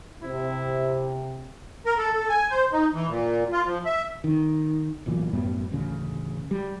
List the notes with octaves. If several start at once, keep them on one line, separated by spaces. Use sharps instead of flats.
C3 E4
A#4
A4
A4
G#5
C5
D#4
E3
A#2
F4
F3
E5
D#3
D1 B1 A#2 E3
F#2 A2 G3 B3
A1 D2 C#3
G3